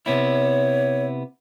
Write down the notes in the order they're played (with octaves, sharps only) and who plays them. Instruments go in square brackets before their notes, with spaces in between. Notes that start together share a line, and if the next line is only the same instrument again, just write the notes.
[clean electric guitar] C3 B3 E4 [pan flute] C#5